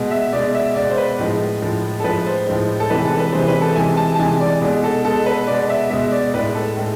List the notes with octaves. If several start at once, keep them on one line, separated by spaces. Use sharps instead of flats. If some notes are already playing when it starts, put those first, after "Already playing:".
Already playing: B2 G#3
E5
B2 G#3 D5
E5
B2 G#3 D5
C5
B4
A2 F3 G#3
A2 F3 G#3
A4
A2 F3 G#3 B4
C5
A2 F3 G#3
A4
C3 E3 G#3 B4
A4
B4
C3 E3 G#3 C5
B4
A4
C3 E3 G#3 G#5
A5
A5
C3 E3 G#3 G#5
D5
B2 G#3
A4
B2 G#3 A4
B4
B2 G#3 D5
E5
B2 G#3 E5
D5
A2 G#3 B4
A4
A2 G#3